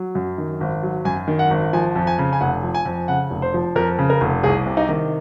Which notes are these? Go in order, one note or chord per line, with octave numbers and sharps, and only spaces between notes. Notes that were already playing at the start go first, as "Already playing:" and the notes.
Already playing: F#3
F#2
D#3
G#1
F#3
F#2 G#5
D#3
F#5
G#1
F3 G#5
F2
G#5
C#3
G#5
F1 F#5
F3
G#5
F2
C#3 F#5
F1
C5
F3
F2 A#4
C#3
A#4
F1
C2 G#4
C3
D#4
D#3